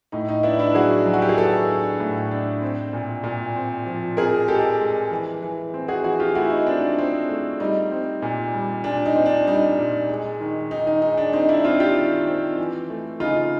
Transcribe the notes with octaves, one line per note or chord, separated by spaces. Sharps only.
A2 D#4
D#4
B3 D4 E4
D4 E4
F#3 F#4 G#4
F#3
F#4
G4
G#4
B3 G4 A4
D4
A2
D4
C4
A#2
A#2
C4
F3
C4 G#4 A#4
G#3 G4 A4
G#3
E3
E3
C4
F#4 G#4
E3 F#4 G#4
F4 G4
A3 E4 F#4
D#4
C4 D4
D4
C4
A3
G3 D#4
C4
A#2
G3
A#2 D4
D#4
C4
D4
G3 D#4
A#2
G#3
D#3
D#3 D#4
D#4
G#3 D#4
D4
C4 D#4
D4 E4
C4 D#4 F4
F4 G4
D#3
C4
E3
A3
C#3 D#4 F4